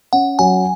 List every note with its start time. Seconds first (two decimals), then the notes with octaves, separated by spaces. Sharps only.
0.13 C#4 F#5
0.39 F#3 G#5